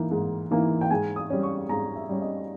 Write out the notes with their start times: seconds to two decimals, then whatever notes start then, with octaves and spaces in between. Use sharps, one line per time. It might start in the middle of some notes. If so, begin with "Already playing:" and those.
Already playing: E3 A#3 D#4
0.11 G#2
0.51 E3 A#3 D#4
0.81 G5
0.91 G#2 G#5
1.16 D#6
1.30 G3 C#4
1.43 C#6
1.69 G#2 A#5
1.96 E5
2.09 G3 C#4
2.22 D#5